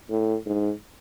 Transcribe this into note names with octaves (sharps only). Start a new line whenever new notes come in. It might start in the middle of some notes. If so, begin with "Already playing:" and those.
A2
G#2